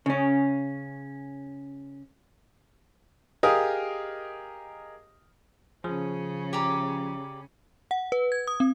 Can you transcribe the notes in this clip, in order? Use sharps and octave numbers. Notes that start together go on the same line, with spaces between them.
C#3 C#4
G4 G#4 A#4 D#5 F5 D#6
C#3 F3 C#4 G#4
G4 D5 A#5
F#5
B4
G#6
D#6
C4